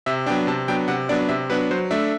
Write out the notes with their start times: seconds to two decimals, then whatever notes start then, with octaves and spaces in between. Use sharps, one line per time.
0.06 C3 E5
0.26 F#3 B3 D4 G5
0.47 C3 A5
0.68 F#3 B3 D4 G5
0.88 C3 F#5
1.09 F#3 B3 D4 D5
1.29 C3 E5
1.49 F#3 B3 D4 B4
1.71 F#3 C5
1.91 A3 D4 E5